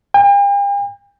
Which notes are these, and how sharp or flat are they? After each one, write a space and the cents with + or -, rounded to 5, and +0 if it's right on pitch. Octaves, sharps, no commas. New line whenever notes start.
G5 +45